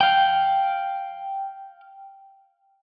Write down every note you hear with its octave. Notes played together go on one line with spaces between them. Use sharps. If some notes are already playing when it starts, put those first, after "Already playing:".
F5 G5